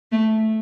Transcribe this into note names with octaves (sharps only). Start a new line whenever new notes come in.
A3